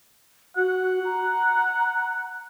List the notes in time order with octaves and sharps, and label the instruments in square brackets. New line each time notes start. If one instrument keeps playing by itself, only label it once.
[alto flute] F#4 [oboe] F#5
[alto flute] A#5